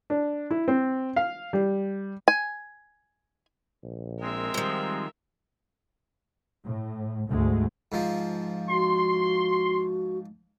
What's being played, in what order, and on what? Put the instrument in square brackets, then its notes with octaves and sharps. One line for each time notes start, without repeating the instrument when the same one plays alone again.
[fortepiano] D4
E4
C4
F5
G3
[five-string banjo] G#5
[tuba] A#1
[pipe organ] G#3 C4 [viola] A#4 E5
[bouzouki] D#3 F3 [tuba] G3
[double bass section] A2
D2 G#2 G#3 A3
[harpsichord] G#2 F3
[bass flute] F#4 [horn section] C6